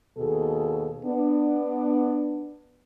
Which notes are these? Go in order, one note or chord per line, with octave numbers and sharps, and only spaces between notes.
D#2 B2 G#4 A4
B3 D4